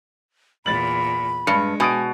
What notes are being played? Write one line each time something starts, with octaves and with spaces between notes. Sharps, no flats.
E2 A#2 B5 A6 F#7
G2 G#3 C#7
B2 G#5 D#6 D7